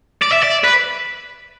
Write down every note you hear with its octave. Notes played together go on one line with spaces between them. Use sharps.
D5
E5
D5
B4